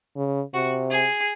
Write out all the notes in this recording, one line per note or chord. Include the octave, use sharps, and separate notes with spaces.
C#3
C3 F#4
G#4